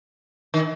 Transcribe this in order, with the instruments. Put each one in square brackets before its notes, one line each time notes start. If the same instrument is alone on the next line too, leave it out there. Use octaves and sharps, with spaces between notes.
[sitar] D#3